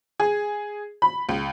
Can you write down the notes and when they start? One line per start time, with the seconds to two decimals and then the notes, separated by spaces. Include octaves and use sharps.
0.20 G#4
1.02 B5
1.29 C#2